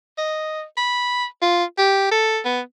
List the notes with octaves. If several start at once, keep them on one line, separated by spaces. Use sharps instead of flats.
D#5
B5
F4
G4
A4
B3